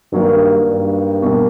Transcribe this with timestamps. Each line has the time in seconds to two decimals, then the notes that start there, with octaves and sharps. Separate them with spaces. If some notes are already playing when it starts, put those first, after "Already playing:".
0.12 G2 D#3 F#3 A#3
0.67 G2
1.22 B2 G3 A#3